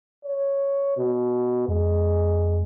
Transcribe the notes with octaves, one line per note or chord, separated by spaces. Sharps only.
C#5
B2
F2 G#3